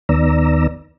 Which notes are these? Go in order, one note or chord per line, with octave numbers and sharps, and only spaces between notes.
D#2 D#3 B3 D5 A#5 E6